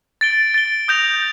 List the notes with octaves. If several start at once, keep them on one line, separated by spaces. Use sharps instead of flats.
A6 D7 G7
A6 D7 G7
D#6 G6 A#6 F7